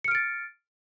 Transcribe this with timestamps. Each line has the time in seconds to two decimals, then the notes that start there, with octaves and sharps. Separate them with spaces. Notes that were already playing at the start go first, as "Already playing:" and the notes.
0.04 C#7
0.08 F6
0.11 D7
0.15 A6